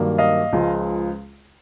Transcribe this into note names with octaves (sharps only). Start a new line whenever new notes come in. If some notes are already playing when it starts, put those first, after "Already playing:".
Already playing: G2 D#3 F#3 A#3
D#5 F5
C#2 C#3 F3 G#3